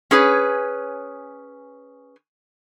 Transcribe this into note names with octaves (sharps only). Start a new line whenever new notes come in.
C#4 G#4 B4 C#5